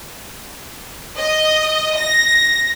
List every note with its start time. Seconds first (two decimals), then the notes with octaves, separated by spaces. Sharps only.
1.18 D#5
1.97 A#6